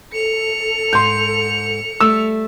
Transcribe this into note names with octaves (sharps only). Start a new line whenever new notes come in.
A4 C#7 F7
G#2 C6 G6
G3 A3 E6